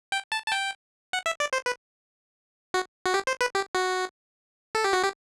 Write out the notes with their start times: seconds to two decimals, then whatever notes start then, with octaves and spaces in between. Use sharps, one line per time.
0.12 G5
0.32 A5
0.47 A5
0.52 G5
1.13 F#5
1.26 E5
1.40 D5
1.53 C5
1.66 B4
2.74 F#4
3.06 F#4
3.14 G4
3.27 C5
3.41 B4
3.55 G4
3.75 F#4
4.75 A4
4.84 G4
4.93 F#4
5.03 G4